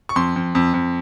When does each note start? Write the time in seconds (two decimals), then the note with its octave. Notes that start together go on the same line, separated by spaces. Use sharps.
0.09 C#6
0.16 F2 C6
0.36 F2
0.55 F2
0.74 F2